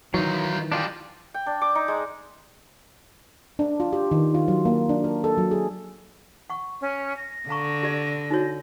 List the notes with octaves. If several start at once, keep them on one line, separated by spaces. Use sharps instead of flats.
D#3 E3 F#3 D#4 F4
G3 D4 F4 G4 D#5
G5
D4
D6
D#4
G#3
D4
F4
G4
D#3
F4
F#3
A#3
D4
A#4
A4
F#3
G#4
F#5 C#6
C#4
A#6
D3 F5 A#5 C#6
G4 D5
D#4 F#4 C#5